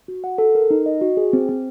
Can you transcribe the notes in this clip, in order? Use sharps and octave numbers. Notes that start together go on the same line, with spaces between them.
F#4
F#5
A4
A#4
D#4
D#5
F#4
G#4
C4
C4